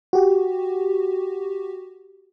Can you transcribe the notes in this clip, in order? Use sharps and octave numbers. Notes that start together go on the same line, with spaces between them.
F#4 G4